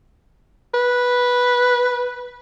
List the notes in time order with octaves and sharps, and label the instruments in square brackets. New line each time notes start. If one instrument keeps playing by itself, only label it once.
[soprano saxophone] B4